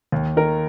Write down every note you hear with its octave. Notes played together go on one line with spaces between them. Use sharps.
D#2
D#3 A#4